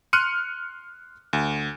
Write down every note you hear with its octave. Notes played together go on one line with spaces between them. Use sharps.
C6 F6 F#6 C#7 D#7
D2